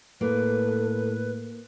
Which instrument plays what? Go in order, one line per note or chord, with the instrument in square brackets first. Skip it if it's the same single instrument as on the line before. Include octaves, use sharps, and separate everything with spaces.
[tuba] A2 [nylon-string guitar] A#3 [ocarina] A4 [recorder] B4